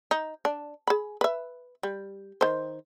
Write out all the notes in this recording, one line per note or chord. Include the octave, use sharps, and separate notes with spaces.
D#4
D4
G#4 B5
B4 E5
G3
D#3 C5